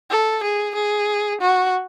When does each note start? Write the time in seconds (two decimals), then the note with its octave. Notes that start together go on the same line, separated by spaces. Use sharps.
0.11 A4
0.43 G#4
0.75 G#4
1.41 F#4